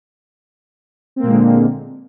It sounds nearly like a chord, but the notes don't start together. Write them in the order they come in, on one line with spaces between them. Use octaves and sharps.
C4 A#3 A#2 G#3 D3